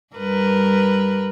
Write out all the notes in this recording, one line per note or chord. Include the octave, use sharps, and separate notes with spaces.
G2 A#4 B4